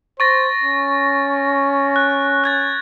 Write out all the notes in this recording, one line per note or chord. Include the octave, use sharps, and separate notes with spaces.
C5 C#6 A6 A#6
C#4
F#6
F#6 G#6 A6